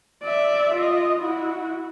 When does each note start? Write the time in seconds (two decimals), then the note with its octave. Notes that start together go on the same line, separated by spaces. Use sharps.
0.23 D5 E5
0.75 F4 D#5
1.19 E4 F#4